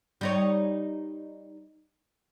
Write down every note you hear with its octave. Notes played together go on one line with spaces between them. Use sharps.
G3 D#4 C#5